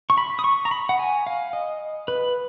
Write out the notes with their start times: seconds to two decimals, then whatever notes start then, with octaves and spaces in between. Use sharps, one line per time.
0.10 C#6
0.18 B5
0.39 D#6
0.44 C#6
0.65 A#5
0.71 B5
0.89 F#5
0.99 G#5
1.27 F5
1.53 D#5
2.08 B4